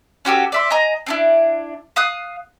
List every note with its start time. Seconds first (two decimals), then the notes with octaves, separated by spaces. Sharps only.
0.25 C#4 F#4 G4 A4
0.52 D5 E5 C6
0.70 D#5 G#5 A#5
1.06 C4 D4 E4
1.96 F5 D#6 F#6